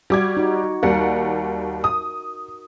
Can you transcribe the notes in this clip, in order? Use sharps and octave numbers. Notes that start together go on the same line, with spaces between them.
G3 F#4 D6 G#6
D#4 F#4
D#2 G3 A#4 F#5
D#6